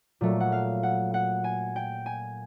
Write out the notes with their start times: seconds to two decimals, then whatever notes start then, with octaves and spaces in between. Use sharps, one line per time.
0.21 A#2 F#3 A3
0.40 F#5
0.52 F5
0.83 F#5
1.14 F#5
1.44 G#5
1.76 G5
2.06 G#5